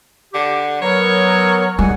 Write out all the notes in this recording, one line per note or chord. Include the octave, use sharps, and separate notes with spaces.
D3 G4
F#3 B3 A#4 C#5
G#2 G3 G#3 F#5 G#5